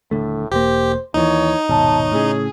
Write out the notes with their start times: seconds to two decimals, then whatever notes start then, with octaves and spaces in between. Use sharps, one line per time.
0.11 D#1 A2 D3 A3
0.51 E1 A#3 G4 C5
1.14 D#2 A#2 E3 D#4 C#5
1.69 D#1 G#1 B2 C#5 A5
2.12 A2 C#3 G#4